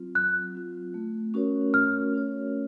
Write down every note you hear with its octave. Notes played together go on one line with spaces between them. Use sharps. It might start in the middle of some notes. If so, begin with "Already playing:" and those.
Already playing: F#3 C4 F4
F#3 F#6
C4 F4
A3
C#4 F#4 A#4 C#5
A3 F6
C#4 F#4 A#4 C#5